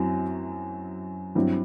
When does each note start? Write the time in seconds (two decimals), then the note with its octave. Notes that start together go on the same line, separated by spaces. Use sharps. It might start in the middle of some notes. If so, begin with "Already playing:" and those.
Already playing: F#2 F#3 C4 E4
1.35 G2 F#3 C4 E4